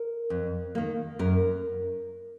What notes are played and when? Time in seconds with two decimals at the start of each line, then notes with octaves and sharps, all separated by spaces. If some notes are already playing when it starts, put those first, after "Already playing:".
Already playing: A#4
0.30 F2
0.75 D#3 A#3
1.19 F#2 A#4